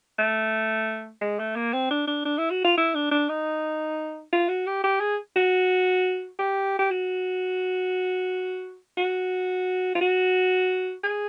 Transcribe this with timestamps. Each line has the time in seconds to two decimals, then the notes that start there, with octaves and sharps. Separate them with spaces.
0.19 A3
1.22 G#3
1.39 A3
1.56 A#3
1.73 C4
1.91 D4
2.08 D4
2.25 D4
2.38 E4
2.51 F#4
2.65 F4
2.78 E4
2.95 D4
3.11 D4
3.29 D#4
4.33 F4
4.49 F#4
4.67 G4
4.84 G4
5.01 G#4
5.36 F#4
6.39 G4
6.79 G4
6.91 F#4
8.98 F#4
9.95 F4
10.01 F#4
11.04 G#4